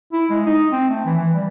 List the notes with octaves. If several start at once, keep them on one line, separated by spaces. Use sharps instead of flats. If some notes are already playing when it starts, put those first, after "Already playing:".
E4
G#3
D#4
C4
A3
E3
E3
G3